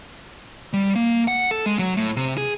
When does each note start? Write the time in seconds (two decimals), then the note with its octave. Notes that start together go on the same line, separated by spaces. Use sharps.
0.73 G3
0.95 A#3
1.28 F#5
1.51 A4
1.66 G#3
1.79 F#3
1.97 A2
2.16 C3
2.38 G#4